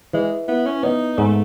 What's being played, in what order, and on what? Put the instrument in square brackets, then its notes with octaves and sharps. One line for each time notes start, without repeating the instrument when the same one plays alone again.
[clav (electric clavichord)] E3 [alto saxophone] G#3
[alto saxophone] B3 [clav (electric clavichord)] E4
[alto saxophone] C#4
[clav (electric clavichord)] B3 [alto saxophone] D#4
[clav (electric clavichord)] G#2 [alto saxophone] A3